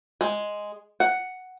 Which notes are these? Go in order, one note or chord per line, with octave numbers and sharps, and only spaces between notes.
G#3
F#5